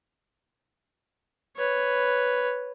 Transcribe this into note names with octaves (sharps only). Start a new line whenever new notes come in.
B4 C#5